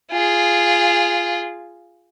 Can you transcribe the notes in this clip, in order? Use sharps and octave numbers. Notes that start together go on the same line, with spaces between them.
F4 G#4